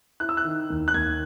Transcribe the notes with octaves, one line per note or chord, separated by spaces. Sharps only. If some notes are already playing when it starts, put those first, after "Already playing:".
E4 F#6
E6
F#6
D#3
D#2
F#6
D#2 G#6